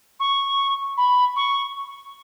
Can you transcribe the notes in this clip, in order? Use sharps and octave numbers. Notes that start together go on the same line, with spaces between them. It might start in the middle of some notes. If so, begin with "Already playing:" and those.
C#6
B5
C#6